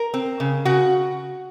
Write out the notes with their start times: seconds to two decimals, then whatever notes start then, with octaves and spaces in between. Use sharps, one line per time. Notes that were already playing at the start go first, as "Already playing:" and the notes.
Already playing: A#4
0.14 C4
0.40 C#3
0.65 C#3 F#4